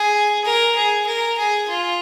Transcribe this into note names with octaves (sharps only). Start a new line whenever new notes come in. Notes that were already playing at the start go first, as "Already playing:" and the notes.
Already playing: G#4
A#4
G#4
A#4
G#4
F4